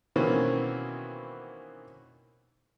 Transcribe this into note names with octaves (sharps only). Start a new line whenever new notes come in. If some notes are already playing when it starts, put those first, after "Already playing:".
B2 D#3 E3 A#3 C4 C#4